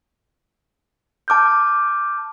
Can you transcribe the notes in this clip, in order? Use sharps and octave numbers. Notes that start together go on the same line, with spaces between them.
A5 D6 F6 G6